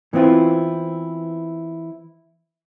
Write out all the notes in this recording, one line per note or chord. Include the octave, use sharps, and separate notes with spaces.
E3 B3 C4 E4 F4